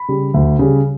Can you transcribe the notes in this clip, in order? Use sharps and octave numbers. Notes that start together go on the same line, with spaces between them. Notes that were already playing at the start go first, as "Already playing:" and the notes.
Already playing: B5
C#3 G3
D2
C#3 G3